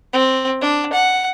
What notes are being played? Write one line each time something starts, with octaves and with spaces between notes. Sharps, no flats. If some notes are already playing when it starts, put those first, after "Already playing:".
C4
D4
F#5